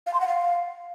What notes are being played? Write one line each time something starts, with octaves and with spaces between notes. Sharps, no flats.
F5
C6
F#5
F5